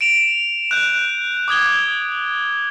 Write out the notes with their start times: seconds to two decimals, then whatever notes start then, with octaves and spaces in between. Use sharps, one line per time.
0.01 D7 E7 F7
0.71 F#6 G6
1.48 D6 D#6 G#6 G7